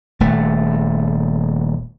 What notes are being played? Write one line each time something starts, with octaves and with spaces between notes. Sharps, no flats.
D#1 A3